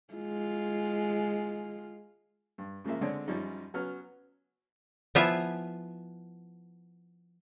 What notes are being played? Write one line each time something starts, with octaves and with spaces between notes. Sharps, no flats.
G#3 F4
G2
C#3 F3 G#3 A#3 E5
D3 G#3 C4 G#4 C#5 D5
F#2 F3 G3 C#4 D#4
F#3 B3 C#4 F6
F3 B3 E4 F4 E5 G#5